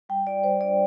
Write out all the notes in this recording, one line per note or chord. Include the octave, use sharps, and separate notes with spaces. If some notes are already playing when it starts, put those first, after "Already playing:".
G3 G5
F4 D5
G3 C5
D4 D5